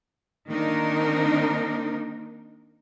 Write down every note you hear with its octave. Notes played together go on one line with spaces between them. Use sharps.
D#3 A#3 C4 D4 D#4 A#4